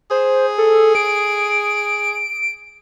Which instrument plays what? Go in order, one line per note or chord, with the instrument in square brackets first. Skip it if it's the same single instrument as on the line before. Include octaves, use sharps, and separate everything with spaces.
[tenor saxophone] G#4 [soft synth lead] C5
[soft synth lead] A4
D7